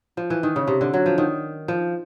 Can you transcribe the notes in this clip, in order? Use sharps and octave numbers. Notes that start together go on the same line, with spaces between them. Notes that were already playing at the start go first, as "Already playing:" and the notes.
F3
E3
D#3
C#3
C3
D3
F#3
F3
D#3
F3